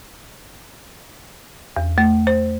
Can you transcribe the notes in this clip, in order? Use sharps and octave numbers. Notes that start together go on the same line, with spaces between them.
E2
A3
C5